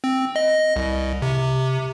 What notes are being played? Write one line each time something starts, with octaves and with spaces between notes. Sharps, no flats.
C4
D#5
C2
C3